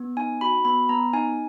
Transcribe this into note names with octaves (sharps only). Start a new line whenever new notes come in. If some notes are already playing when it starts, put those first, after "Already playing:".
Already playing: B3
D#4 G#5
F#4 B5
B3 B5
B3 A#5
D#4 G#5